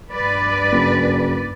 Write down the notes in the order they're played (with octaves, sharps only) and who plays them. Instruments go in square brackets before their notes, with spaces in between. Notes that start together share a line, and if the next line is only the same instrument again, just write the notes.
[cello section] G2 B4 D5
[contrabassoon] F#1